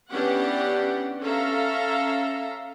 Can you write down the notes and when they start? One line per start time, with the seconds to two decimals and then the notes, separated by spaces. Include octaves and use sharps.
0.10 E3 B3 C#4 D4 G4 F#5
1.23 C#4 A4 E5 F5 A#5